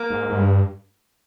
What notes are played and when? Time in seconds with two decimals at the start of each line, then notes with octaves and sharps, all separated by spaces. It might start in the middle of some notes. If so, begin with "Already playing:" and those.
Already playing: A#3
0.10 G#2
0.29 G#2
0.37 G2